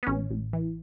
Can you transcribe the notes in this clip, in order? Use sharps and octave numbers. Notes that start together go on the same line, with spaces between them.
B3
A1 C#4
A1
E3